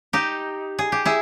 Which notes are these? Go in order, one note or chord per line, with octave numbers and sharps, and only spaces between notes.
D#4 G4
G#4
G4
E4 G#4